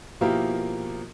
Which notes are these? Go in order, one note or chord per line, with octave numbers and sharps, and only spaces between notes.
B2 F3 A#3 E4 G4 A#4